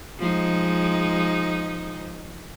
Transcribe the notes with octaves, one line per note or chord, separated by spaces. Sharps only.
F3 G#3 D#4